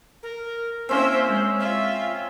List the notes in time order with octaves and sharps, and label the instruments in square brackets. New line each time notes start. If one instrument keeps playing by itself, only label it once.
[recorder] A#4
[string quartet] A#3 E4 E5 [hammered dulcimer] C4 C#4 [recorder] C5
[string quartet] G#3
[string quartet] F4 [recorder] E5